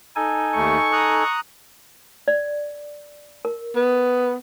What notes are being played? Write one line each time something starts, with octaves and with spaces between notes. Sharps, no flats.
D#4 A4 G#5
D#2 A3 C#6
A#5 D#6 F#6
D5
A#4
B3